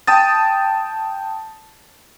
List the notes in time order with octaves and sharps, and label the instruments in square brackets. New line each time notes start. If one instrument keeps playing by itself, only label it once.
[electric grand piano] G5 A5 D#6 A6